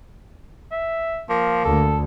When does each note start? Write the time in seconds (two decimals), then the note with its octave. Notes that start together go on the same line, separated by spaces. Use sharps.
0.72 E5
1.29 F3 A#3
1.64 D2 A4